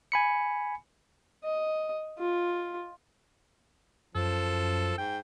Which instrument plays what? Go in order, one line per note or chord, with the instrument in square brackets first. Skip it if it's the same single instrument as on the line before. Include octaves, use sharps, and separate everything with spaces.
[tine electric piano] G#5 B5 C#7
[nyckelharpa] D#5
F4
[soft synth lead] F#2 [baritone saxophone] F3 [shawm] A4
[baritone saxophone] G#2 [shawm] G5